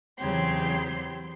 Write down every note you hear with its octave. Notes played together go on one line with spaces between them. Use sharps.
E2 C#3 F#3 C4 G4 C6